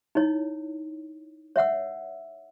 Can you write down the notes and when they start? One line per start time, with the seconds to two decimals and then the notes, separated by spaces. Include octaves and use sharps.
0.15 D#4 E4 C#5
1.56 C#5 E5 F#5 E6